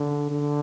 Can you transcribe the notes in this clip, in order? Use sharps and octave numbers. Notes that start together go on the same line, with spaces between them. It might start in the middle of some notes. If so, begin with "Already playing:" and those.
Already playing: D3
D3